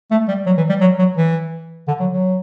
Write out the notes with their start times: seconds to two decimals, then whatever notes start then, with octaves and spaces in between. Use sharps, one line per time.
0.11 A3
0.28 G3
0.46 F#3
0.58 E3
0.69 G3
0.81 F#3
0.99 F#3
1.17 E3
1.88 D3
2.00 F#3
2.12 F#3